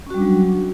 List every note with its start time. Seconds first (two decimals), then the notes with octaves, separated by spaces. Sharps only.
0.07 C#4
0.10 F#4
0.14 G3
0.18 D4
0.22 F#3